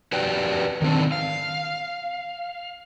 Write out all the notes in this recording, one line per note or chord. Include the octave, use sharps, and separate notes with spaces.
F#4 G4 B4 D5 G5
D#3 C4 D4
F5